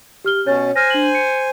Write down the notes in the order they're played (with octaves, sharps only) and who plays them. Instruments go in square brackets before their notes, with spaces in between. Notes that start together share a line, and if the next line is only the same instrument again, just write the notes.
[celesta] G4 F6 G7
[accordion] B2 C#4 [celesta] C#5 A6
[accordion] C5 G#5 [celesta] F6 A#6
[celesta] D4 F#7
C#7